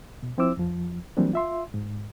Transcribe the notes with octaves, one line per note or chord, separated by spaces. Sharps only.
B2
F3 C4 E4 C5 D6 E6
F2 F3
E3 F#3 G3 A#3 C4 D4
F4 E5 C6
G#2